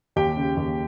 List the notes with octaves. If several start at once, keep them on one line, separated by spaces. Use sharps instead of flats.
D#2 G4 G5
C#3
D#2